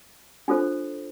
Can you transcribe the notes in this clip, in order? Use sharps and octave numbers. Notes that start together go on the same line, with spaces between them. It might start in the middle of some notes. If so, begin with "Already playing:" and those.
D4 F4 A4 C5